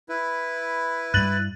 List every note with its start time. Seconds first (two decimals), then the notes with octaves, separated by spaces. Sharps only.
0.09 E4 B4
1.14 G2 G3 F#6 A6 F#7